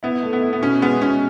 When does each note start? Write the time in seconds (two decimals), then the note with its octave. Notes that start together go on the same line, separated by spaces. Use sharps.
0.03 B3 E4
0.23 A3
0.33 B3
0.42 E4
0.53 B3
0.61 B2 C#4
0.82 G#3 B3
1.01 B2 C#4